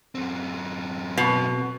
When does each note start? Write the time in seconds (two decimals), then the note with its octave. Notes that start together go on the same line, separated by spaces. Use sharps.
0.15 F#2 C4
1.18 B2